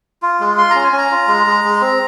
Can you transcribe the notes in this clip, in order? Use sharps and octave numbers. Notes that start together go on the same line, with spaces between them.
F4
G#3
F4 C6
C#4 A#5
G#5
C#4
A#5
F4
G#3
G#3
G#3
C4